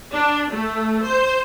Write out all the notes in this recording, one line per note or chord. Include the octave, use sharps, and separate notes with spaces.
D4
A3
C5